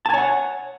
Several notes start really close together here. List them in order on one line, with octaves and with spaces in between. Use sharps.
A5 G#5 C#5 F#5